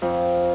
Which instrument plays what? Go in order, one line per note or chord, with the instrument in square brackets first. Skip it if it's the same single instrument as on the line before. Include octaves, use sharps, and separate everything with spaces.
[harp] F2